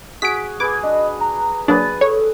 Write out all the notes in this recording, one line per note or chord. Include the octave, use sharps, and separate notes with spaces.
F#4 G#4 B6 D7
G#4 B4 D6 G#6
D4 D#5
A#5
F#3 A#3 D4 G#4 B4 A6
A4 C#5